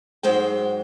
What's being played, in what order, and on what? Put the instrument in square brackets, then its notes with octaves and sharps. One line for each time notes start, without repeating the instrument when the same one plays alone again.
[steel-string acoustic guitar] G#2 F#3 G#3 C5 G5